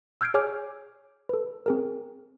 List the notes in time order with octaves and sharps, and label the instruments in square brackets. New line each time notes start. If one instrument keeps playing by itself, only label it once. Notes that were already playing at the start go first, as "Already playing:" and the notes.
[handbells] E6 F6 G6 G#6 C7 D7
G#4 C#5 G#5 D6 F6
A4 B4
C4 G#4 A#4